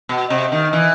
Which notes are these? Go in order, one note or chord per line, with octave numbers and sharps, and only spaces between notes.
B2
C3
D#3
E3